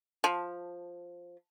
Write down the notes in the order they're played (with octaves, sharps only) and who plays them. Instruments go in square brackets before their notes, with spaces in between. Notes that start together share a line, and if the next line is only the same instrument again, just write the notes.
[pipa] F3